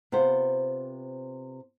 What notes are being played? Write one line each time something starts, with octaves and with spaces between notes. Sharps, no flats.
C3 B3 F4 C5